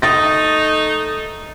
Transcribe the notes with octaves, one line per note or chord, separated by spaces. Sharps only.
A3 D#4 D#6 A6 A#6